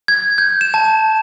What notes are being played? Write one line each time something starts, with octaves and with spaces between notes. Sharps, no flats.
G#6
G6
E7
A5